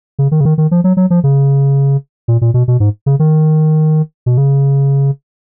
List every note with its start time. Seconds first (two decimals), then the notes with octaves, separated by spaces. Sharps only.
0.19 C#3
0.31 D#3
0.41 C#3
0.45 D#3
0.58 D#3
0.71 F3
0.84 F#3
0.97 F#3
1.10 F3
1.24 C#3
2.28 A#2
2.41 A#2
2.54 B2
2.68 B2
2.80 G#2
3.06 C#3
3.19 D#3
4.26 B2
4.38 C#3